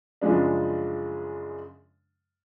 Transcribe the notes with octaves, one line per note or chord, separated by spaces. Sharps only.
F#2 C#3 F3 G#3 D4